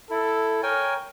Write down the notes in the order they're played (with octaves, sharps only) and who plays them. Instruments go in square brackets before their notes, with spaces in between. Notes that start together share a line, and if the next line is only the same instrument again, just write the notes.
[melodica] E4 [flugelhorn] A4
[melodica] A#4 G5 G#5 [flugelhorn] C#5